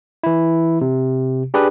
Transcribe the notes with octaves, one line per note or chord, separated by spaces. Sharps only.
E3 E4
C3
D4 G4 G#4 B4